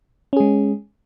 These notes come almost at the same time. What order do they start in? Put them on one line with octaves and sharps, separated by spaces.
C#4 G#4 G#3